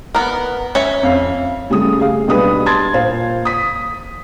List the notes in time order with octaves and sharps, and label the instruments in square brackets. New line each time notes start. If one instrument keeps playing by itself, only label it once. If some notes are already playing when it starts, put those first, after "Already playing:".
[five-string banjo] B3 A#4
C#4 E5
[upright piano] F2 F5
[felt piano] C#3 G3 A3 G#4 D#6
G#4 F5
B1 G3 D4 B4 D#6
A5 C6 G#6 A6
A#2 C5 F5
D#6 B6